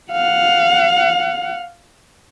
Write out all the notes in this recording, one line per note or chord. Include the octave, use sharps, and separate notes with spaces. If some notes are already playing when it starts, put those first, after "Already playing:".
F5 F#5